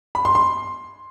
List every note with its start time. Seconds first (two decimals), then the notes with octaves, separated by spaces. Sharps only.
0.15 B5
0.25 C6
0.35 C6